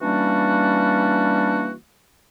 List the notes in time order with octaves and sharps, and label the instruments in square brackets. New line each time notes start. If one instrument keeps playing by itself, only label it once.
[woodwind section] E3 G3 A#3 C#4 D4 F#4